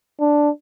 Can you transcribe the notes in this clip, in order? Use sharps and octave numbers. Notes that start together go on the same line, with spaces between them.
D4